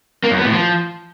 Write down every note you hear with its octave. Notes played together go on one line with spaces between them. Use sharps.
A#3
F#2
B3
A2
F3